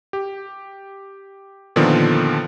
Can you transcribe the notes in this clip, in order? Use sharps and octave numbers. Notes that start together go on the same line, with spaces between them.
G4
A#2 D3 D#3 F3 B3